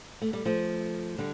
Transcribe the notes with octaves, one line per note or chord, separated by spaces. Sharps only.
A3
G3
F3 A3
D3 G3